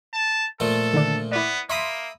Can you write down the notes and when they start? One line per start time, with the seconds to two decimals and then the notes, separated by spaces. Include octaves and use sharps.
0.13 A5
0.60 A#2 F3 A3 A4
0.94 D3 D#3 D4
1.32 B3 E4 D5
1.70 A#3 E5 B5 C6 D#6 B6